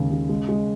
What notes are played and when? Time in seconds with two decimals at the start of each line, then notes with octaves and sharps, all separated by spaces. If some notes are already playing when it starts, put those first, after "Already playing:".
Already playing: D#2 C#3 G#3
0.11 C#3
0.29 G#3
0.49 G#3